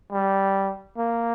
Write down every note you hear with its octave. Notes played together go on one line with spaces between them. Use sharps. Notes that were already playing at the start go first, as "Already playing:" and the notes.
G3
A#3